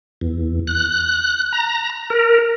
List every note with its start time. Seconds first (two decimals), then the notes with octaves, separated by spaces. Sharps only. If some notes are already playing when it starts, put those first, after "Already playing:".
0.21 E2
0.67 F#6
1.52 A#5
2.10 A#4